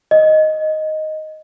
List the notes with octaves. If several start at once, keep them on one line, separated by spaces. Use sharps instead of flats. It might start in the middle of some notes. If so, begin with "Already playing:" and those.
D#5